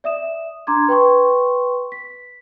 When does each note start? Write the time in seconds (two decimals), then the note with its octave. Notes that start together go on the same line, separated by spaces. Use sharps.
0.04 D5 E5 D#6 E7
0.67 D4 A#5 C6 D6 G#6
0.88 B4 G5 C6 C#6
1.92 B6